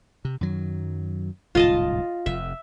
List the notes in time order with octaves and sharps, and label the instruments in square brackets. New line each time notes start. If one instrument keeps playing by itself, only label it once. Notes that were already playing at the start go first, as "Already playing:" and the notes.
[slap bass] C3
F#2 D#3 F#3
[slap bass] D1 C2 G#2 [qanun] F4 D#5 A5
[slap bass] F1 F2 [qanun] E5